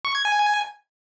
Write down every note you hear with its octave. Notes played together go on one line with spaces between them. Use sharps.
C#6
G#6
G#5